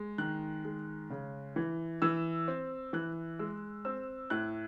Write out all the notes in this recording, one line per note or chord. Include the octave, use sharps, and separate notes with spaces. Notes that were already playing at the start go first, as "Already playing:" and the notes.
Already playing: G#3
D#3 F#6
G#3
C#3
E3
E3 E6
C4
E3 F#6
G#3 E6
C4 E6
A2 F#6